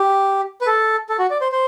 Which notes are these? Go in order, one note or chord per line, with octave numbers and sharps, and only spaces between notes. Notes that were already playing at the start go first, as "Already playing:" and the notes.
Already playing: G4
B4
A4
A4
F#4
D5
C5
C5